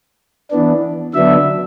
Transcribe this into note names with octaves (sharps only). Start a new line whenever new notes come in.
E3 B3 D4
D3 F#3 B3 D4 E5